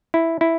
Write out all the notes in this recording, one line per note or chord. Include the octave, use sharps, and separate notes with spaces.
E4
E4